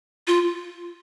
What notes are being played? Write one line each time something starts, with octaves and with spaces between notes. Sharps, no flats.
F4